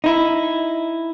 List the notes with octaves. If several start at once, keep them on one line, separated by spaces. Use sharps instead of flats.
D#4 E4